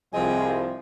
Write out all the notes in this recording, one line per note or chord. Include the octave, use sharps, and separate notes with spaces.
C2 F3 C4 G#4 D#5